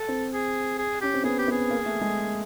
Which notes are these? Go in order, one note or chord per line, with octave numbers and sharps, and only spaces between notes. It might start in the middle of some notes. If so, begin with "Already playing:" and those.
Already playing: A4
C4
G#4
G#4
C#4 G4
C4
B3 G#4
G4
B3
G#4
A#3
A3
G#3